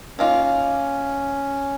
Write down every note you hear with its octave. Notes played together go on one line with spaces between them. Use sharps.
D#3 A#3 C#4 F4